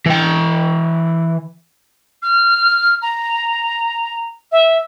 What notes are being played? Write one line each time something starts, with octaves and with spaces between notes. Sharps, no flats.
E3 G5
F6
A#5
E5